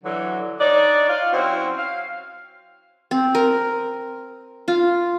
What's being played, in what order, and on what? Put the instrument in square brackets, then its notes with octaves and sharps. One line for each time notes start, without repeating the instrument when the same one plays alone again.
[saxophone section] D3 E3 F#3
D4 D#4 C#5 D5
F4 F5
F#3 C4 C#4 E4 F#4 C5
F5
[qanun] C4
A#4
F4